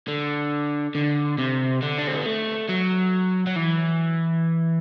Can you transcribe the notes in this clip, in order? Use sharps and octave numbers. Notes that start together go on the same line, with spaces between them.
D3
D3
C3
D3
D4
C4
B3
A3
F#3
F#3
E3